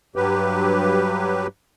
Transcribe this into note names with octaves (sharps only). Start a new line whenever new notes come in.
G2 F#3 G4 B4